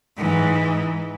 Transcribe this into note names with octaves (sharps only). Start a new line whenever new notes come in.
G#2 E3